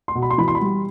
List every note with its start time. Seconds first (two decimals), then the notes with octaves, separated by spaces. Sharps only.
0.08 C6
0.15 B2
0.22 B5
0.30 C6
0.38 E3 B5
0.48 C6
0.55 B5
0.61 G3